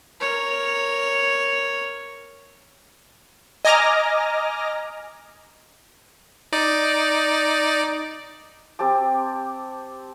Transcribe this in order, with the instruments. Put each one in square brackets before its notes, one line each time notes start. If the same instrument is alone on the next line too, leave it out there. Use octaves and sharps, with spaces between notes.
[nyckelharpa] A#4 C#5
[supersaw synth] D#5 G#5 A#5 D6 F6 A#6
[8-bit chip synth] D#4 D5
[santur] C4 G4 A5 D6